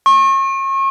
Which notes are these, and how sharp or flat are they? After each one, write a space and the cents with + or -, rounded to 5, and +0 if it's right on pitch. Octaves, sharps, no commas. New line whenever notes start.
C#6 -35